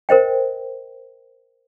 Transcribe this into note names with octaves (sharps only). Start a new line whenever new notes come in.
A#4 C5 D#5 G5